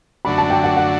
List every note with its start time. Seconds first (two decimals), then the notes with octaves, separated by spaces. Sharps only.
0.25 F#2 D3 A3 D4 F#4 B5
0.38 A5
0.50 G5
0.64 F#5
0.77 F#5